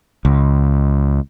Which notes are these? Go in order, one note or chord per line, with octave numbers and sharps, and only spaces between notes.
C#2